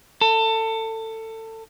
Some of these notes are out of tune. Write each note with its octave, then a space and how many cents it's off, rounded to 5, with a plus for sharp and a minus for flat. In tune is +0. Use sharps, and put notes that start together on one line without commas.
A4 +25